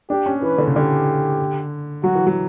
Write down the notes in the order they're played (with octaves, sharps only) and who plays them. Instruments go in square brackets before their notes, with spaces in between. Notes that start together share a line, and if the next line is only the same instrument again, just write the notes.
[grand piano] D4 [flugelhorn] G4
[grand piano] C#4
[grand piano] E3 [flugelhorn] B4
[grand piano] D3
C#3
[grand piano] D3 [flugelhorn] G4
[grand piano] F#3 [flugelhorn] F#4
[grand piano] E3
F#3